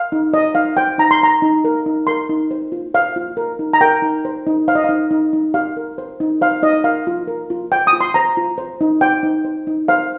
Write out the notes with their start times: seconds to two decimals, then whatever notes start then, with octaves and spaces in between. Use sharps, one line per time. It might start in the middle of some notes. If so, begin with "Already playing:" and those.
Already playing: F5
0.12 D#4
0.33 C5 D#5
0.55 D#4 F5
0.77 C5 G5
0.98 D#4 A#5
1.11 C6
1.21 C5 A#5
1.42 D#4
1.64 A#4
1.86 D#4
2.07 A#4 C6
2.29 D#4
2.51 C5
2.72 F4
2.94 C5 F5
3.16 F4
3.37 A#4
3.59 D#4
3.73 A#5
3.81 A#4 G5
4.02 D#4
4.25 C5
4.47 D#4
4.68 C5 F5
4.75 D#5
4.84 D#4 F5
5.11 D#4
5.33 D#4
5.54 G4 F5
5.77 A#4
5.98 C5
6.20 D#4
6.41 C5 F5
6.62 D#4 D#5
6.84 A#4 F5
7.07 F4
7.28 A#4
7.50 F4
7.72 C5 G5
7.87 D#6
7.93 F4
8.01 C6
8.14 C5 A#5
8.37 F4
8.58 C5
8.81 D#4
9.01 C5 G5
9.23 D#4
9.45 C5
9.67 D#4
9.88 C5 F5